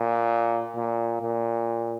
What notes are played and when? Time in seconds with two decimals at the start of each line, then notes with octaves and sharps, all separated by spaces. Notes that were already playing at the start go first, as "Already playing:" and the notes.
Already playing: A#2
0.76 A#2
1.21 A#2